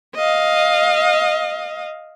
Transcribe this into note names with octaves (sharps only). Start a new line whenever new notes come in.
D#5 F5